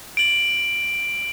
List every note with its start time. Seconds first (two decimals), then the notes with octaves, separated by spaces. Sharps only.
0.17 D7 F#7